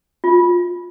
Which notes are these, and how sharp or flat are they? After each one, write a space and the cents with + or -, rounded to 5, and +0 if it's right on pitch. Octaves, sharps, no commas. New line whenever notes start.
F4 +15